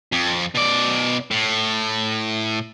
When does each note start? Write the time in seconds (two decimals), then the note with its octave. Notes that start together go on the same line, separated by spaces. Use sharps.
0.12 F2
0.55 B2 D5
1.31 A2